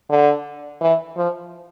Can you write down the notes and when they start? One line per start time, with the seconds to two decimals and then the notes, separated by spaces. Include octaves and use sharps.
0.10 D3
0.81 E3
1.17 F3